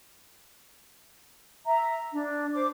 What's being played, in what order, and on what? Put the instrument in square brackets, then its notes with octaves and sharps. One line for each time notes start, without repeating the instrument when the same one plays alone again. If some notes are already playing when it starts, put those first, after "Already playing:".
[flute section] E5 A#5
D4
C5 D6